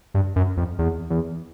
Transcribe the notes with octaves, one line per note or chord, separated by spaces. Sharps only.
G2
F#2
F2
E2
E2